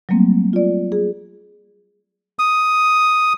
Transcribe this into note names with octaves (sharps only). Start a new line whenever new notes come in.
F#3 G3 A3 A#3 C4
F4 D5
G#4
D#6